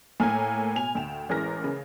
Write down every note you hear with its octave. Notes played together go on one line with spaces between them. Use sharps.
A2 A#3 G#5 A#5 F6
B2 G#5 F7
D2 G5 E7
A1 E3 G#3 A#4 F6 A#6
C#3